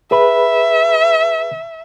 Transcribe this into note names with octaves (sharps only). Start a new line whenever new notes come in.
G#4 B4 E5 B5